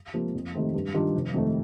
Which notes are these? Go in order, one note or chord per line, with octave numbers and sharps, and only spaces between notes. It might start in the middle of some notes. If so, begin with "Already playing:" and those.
C3 F3 A#3
F2
C3 D#3 A3 C4
G2
D#3 G3 D4 F4
F1
F2 D#3 A3